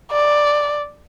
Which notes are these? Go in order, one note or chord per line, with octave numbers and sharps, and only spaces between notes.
D5